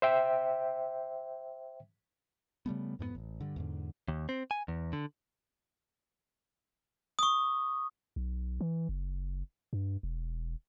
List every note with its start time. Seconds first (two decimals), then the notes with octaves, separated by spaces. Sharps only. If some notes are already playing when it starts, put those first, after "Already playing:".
0.02 C5 E5 G5
2.66 C#3 G3 A3 B3
2.99 F2 G#2 A3 B3
3.15 A1
3.41 G2 D3
3.56 E2 G#2 D3
4.08 D#2
4.29 C4
4.51 G#5
4.68 E2
4.93 D3
7.19 C#6 D#6
8.16 B1
8.61 E3
8.89 F#1
9.73 G2
10.03 E1